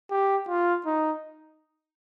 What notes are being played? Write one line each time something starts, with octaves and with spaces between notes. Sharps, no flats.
G4
F4
D#4